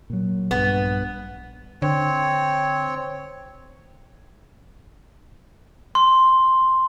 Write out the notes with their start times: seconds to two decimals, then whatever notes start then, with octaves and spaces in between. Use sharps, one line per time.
0.10 A#2 F#3
0.51 A#1 G2 B3
1.82 D3 C4 C#5
5.95 C6